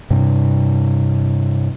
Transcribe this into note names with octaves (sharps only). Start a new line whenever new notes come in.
G2 C3